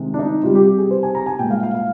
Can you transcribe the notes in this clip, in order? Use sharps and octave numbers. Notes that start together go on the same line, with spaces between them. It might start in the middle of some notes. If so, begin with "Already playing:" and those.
Already playing: C3 D#3 G#3
D4
D#4
C3 G3 F4
G4
G4
G#4
C5
G#5
A#5
G#5
A#2 G#3 G5
F5
F5
F5